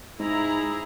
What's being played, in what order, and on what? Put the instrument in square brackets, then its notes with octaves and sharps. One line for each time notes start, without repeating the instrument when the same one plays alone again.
[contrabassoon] G#2 [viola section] E4 G#4 A#5